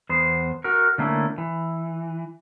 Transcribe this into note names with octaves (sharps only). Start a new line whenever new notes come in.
E2 B3 C5
F#4 A#4
D3 A3 A#3 C#4 E4
E3